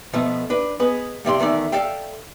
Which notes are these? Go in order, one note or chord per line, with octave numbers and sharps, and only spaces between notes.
B2 F3 A3 B3
D4 B4
B3 G#4 B4 D#5
G2 C3 D5 C6
E2 D#3 A3 D5
A4 D5 E5 F5 G5